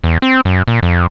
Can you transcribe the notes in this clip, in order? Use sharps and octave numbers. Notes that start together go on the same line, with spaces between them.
E2
C4
F#2
A#2
F2